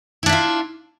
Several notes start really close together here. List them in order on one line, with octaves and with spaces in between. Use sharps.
E4 D4 E5 F4